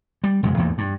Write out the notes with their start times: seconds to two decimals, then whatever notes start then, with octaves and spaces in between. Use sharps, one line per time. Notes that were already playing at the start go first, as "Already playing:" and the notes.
0.24 G3
0.43 E1 F#2 C#3 G#3
0.57 A1 E2 G#2 A#3
0.78 G2